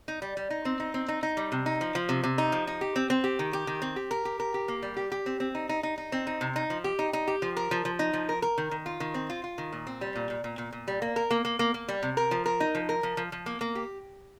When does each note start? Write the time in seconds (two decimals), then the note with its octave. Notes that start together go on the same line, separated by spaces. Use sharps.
0.08 D#4
0.22 G3
0.37 G3
0.50 D#4
0.65 C4
0.80 D#4
0.94 C4
1.08 D#4
1.23 D#4
1.37 G3
1.52 C3
1.66 D#4
1.81 F3
1.95 F3
2.09 C3
2.24 C3
2.38 D#4
2.52 F3
2.67 D#4
2.81 G4
2.96 C4
3.10 C4
3.24 G4
3.39 D#3
3.53 G4
3.67 D#3
3.82 C4
3.96 G4
4.11 A#4
4.25 G4
4.40 A#4
4.54 G4
4.68 A#3
4.83 G3
4.97 G4
5.12 G4
5.26 C4
5.40 C4
5.55 D#4
5.69 D#4
5.83 D#4
5.98 D#4
6.12 C4
6.27 D#4
6.41 C3
6.56 D#4
6.70 F3
6.84 G4
6.99 D#4
7.13 D#4
7.28 G4
7.42 F3
7.57 A#4
7.71 F3
7.85 F3
7.99 D#4
8.13 F3
8.29 A#4
8.42 A#4
8.58 D#3
8.71 D#3
8.86 F4
9.00 D#3
9.14 C4
9.30 F4
9.44 F4
9.58 D#3
9.73 A#2
9.87 C4
10.01 G3
10.16 A#2
10.30 A#2
10.44 A#2
10.58 A#2
10.73 A#2
10.88 G3
11.02 A#3
11.16 A#4
11.31 A#3
11.45 A#3
11.59 A#3
11.74 A#3
11.88 G3
12.03 C3
12.17 A#4
12.31 F3
12.46 A#4
12.60 D#4
12.75 F3
12.89 A#4
13.03 F3
13.17 F3
13.32 F3
13.46 A#3
13.61 A#3
13.75 G4